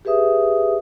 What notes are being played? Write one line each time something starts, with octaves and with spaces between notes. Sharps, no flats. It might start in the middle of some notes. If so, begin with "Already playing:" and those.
G4 G#4 B4 E5 D#6